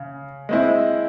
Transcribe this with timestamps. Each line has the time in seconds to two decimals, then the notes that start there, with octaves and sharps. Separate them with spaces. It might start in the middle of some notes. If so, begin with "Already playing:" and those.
Already playing: C#3
0.49 G#3 C4 E4